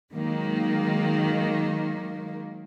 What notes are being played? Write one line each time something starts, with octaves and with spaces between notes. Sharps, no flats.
D#3 F#3 G#3 A#3